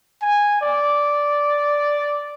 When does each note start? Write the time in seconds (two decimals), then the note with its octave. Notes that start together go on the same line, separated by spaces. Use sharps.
0.22 G#5
0.61 D5